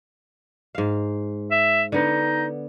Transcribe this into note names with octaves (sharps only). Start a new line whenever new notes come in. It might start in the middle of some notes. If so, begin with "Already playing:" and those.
G#2 F5
E5
D3 B3 D#4